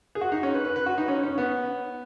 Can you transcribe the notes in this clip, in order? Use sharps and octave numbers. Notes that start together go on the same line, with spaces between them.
G#4
F#4
D#4
C#4
B4
B4
B4
F#4
D#4
C#4
C#4
B3